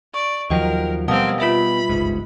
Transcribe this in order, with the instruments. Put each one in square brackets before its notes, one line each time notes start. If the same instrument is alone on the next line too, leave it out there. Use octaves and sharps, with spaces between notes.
[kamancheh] D5 [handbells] C#6
[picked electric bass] D#2 F3 F#3 [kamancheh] A#4 [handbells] D#5 G5
[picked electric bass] B2 G3 [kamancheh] A#3 C4 [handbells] F#5 A5 D#6
[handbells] F4 B4 E5 [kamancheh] B5
[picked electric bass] G1 C#2 G#2